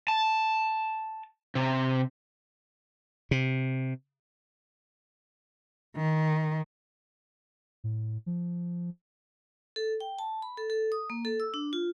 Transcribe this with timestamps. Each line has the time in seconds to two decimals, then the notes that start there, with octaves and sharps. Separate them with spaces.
0.08 A5
1.55 C3
3.31 C3
5.96 D#3
7.84 A2
8.26 F3
9.76 A4
10.00 G5
10.19 A5
10.42 B5
10.57 A4
10.70 A4
10.92 D#6
11.10 A#3
11.25 A4
11.40 E6
11.54 D4
11.73 F4